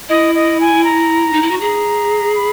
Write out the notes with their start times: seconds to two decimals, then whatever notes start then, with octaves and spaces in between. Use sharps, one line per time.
0.09 E4 D#5
0.35 D#5
0.60 G#5
0.84 A#5
1.33 D#4
1.42 E4
1.51 F#4
1.59 G#4 A#5
2.35 B5